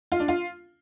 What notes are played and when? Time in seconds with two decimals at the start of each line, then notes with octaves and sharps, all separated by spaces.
0.12 F4
0.20 D4
0.28 F4